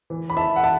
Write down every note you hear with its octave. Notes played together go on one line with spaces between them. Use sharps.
E3
B5
E3 E5 A5
F#5
E5 A5